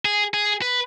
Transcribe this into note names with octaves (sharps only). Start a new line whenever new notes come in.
G#4
G#4
B4